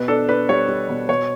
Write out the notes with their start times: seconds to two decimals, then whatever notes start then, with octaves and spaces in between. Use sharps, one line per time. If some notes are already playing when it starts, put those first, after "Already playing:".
Already playing: B2 B4
0.08 D4 A4
0.29 D4 B4
0.49 G3 C#5
0.69 G3
0.89 B2
1.09 B2 C#5